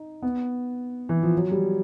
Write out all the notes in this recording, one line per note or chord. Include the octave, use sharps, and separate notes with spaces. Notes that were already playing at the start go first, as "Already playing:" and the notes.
Already playing: D#4
B3
E3
F3
F#3
G3